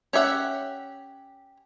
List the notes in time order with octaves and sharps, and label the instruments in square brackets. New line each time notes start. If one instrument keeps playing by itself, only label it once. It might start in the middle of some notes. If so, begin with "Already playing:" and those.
[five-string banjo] C#4 G4 E5 F#5